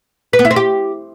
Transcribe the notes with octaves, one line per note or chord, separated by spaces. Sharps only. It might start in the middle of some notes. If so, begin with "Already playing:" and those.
B4
B3
E4
C4
G4